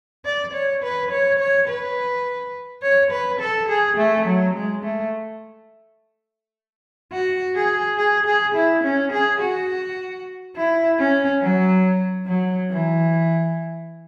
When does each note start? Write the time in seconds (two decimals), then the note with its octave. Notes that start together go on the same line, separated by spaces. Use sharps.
0.25 D5
0.54 C#5
0.83 B4
1.11 C#5
1.39 C#5
1.68 B4
2.83 C#5
3.11 B4
3.40 A4
3.69 G#4
3.98 A3
4.26 F#3
4.54 G#3
4.83 A3
7.12 F#4
7.55 G#4
7.98 G#4
8.26 G#4
8.55 E4
8.84 C#4
9.12 G#4
9.40 F#4
10.56 E4
10.98 C#4
11.41 F#3
12.26 F#3
12.70 E3